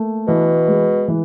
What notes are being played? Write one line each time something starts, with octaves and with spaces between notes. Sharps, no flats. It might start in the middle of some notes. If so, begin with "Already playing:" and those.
Already playing: A3 A#3
B2 E3
G#3
E3